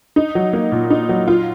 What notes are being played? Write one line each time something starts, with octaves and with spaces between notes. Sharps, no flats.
D#4
F#3
A#3
A#2
D#4
F#3
F4